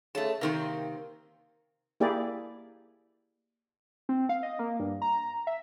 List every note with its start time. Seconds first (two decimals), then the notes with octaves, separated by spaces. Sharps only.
0.15 C#3 A3 A5
0.41 C3 D#3 A#3 C4
2.00 A#3 E4 G4 G#4 D5
4.09 C4
4.29 F5
4.43 D#5
4.59 A#3
4.80 G2
5.02 A#5
5.47 E5